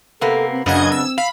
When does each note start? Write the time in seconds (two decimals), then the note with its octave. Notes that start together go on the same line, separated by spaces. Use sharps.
0.21 C3 A#3 B3 A4
0.52 C4
0.66 F#2 C#3 B3 D4 D#5 F#5 G#6
0.92 C4 E6
1.18 F5 B5